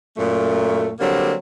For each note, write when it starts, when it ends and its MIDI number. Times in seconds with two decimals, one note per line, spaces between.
0.17 0.92 42
0.17 0.92 46
0.17 0.92 57
1.00 1.33 50
1.00 1.33 54
1.00 1.33 55
1.00 1.33 58
1.00 1.33 60